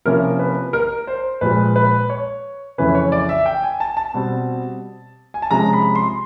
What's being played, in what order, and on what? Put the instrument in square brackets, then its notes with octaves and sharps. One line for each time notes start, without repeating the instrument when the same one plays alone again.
[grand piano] C3 F3 A#3 C#4 E4 A#4
B4
A#4
C5
A#2 F3 G#3 B4
B4
C#5
F2 C#3 E3 A3 C#4 B4
C#5
D5
E5
G5
G#5
A5
A5
B2 G3 C4
G#5
A5
C3 F3 G#3 C#4 A#5
B5
C6